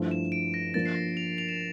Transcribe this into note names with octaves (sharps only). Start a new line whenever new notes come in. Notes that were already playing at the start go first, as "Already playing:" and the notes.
Already playing: G2 F3 A3 E4
E7
D7
A#6
F3 A#3 D4 A6
C7
A#6
F7
F7
E7